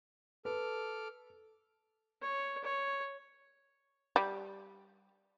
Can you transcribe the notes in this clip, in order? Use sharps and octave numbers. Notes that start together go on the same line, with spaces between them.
A4 B4 D6 F6
C#5
C#5
G3